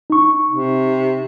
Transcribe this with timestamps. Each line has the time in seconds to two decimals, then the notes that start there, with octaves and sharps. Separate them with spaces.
0.10 D#4 C#6
0.49 C3